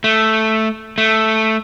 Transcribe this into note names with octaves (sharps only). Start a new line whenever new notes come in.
A3
A3